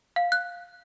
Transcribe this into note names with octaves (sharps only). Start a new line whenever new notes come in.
F5
F#6